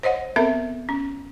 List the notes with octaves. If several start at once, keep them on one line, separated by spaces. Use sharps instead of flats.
C5 C#5 D#5 F#5
B3 C4 A4 A#4 E5
C#4